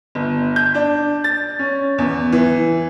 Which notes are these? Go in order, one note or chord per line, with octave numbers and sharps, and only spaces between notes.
G1
G6
D4
A6
C#4
E2
E3